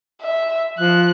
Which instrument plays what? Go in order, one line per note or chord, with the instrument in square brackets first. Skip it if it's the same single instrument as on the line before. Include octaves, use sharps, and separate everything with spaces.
[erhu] E5
[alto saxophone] F3 [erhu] F#6